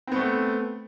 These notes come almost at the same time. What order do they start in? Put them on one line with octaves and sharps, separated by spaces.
C4 B3 A3